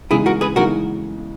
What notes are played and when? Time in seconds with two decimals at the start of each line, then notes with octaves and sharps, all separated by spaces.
0.11 C#3 E3 G#3 D#4 E4 G#4
0.26 F#4 A#4
0.41 G#4 B4
0.56 C#3 E3 G#3 D#4 F#4 A#4